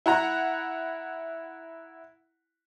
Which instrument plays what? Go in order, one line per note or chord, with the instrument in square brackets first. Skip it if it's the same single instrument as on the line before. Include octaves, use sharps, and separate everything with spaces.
[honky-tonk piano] E4 F#5 A#5